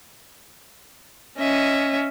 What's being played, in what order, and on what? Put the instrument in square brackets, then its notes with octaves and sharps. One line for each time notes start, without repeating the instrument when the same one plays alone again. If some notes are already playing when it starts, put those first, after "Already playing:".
[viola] C#4 [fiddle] D#5 E5